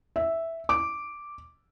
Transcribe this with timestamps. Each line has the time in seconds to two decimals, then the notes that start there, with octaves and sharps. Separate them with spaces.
0.16 E5
0.69 D6